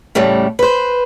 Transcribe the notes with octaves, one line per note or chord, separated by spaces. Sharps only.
A2 C#3 G3 A3
B4 C5